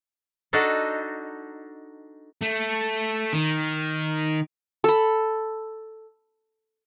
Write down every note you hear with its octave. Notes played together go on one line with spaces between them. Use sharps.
D4 D#4 F#4 A4
A3
D#3
A4 B5